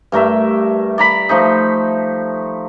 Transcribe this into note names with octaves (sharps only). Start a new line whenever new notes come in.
G2 A3 A#4 E5
D5 A#5 B5
F3 A3 D#4